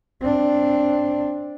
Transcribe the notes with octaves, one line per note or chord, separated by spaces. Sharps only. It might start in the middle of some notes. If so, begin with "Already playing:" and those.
C4 D4